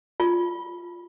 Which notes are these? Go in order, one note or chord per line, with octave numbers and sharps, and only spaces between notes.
F4